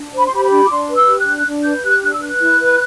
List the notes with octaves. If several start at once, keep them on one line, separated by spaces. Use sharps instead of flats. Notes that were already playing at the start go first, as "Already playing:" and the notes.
Already playing: D4
C5
B5
C6
G4 B5
B5
D4
D6
D4 C6
B4
E6
G4
F#6
D4
D4
B4 G6
G4 F#6
D4 F#6
E6
B4 F#6
E4
B4